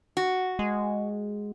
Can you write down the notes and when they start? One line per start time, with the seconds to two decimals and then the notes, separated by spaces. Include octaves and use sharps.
0.17 F#4
0.59 G#3